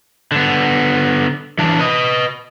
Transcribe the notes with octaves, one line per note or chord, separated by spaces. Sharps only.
D3 B3
E3 D4
B4 D#5